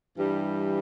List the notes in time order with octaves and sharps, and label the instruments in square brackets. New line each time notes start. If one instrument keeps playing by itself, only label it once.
[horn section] G2 E3 G3